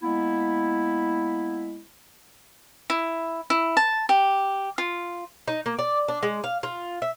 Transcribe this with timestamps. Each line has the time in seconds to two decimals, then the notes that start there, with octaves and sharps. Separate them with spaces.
0.02 G#3 A#3 B3 E4
2.90 E4
3.50 E4
3.77 A5
4.09 G4
4.78 F4
5.48 D#4
5.66 A#3
5.78 D5
6.08 D4
6.23 G#3
6.44 F5
6.63 F4
7.02 E5